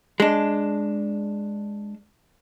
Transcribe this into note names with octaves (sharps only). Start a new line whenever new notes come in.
G#3 D4